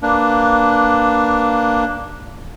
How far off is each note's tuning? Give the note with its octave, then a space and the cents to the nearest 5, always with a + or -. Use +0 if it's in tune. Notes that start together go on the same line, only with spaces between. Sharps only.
A#3 +0 D4 +0 B4 +0